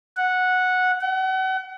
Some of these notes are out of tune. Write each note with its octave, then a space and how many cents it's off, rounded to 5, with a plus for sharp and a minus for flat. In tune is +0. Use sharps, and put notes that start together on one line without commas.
F#5 -10
F#5 +35